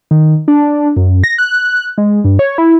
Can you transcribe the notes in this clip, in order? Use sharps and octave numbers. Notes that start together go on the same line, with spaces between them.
D#3
D4
F#2
A#6
F#6
G#3
G2
C#5
E4